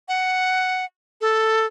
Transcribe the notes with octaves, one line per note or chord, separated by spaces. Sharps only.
F#5
A4